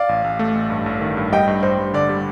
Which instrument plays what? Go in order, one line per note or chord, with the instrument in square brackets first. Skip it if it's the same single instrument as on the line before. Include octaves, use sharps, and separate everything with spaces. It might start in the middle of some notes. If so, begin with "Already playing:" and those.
Already playing: [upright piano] D5 F5
[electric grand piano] A1
A1
A3
A1
G2
A1
D#3
G2
[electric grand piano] G3 [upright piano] D#5 G5
[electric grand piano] G2
[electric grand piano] G2 [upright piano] C5
[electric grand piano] G2
[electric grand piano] D3 [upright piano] D5
[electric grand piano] G3